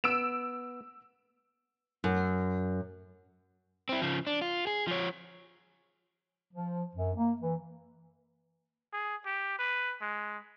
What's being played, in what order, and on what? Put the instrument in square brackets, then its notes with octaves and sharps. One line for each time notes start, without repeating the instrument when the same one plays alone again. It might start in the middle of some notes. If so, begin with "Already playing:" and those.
[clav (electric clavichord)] B3 [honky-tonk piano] E6 D7 E7
[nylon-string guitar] F#2
[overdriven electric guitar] C4 E4
C#3 F3
D4
F4
G#4
F3 C#5
[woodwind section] F3
F#2
A#3
E3
[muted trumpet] G#4
G4
B4
G#3